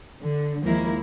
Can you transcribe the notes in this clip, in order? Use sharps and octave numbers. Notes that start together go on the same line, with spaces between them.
D3
D#2 F3 G#3 A#3 E4 A#4